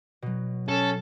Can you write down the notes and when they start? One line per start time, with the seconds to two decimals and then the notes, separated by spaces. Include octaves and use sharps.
0.22 B2 F#3
0.68 C#4 A4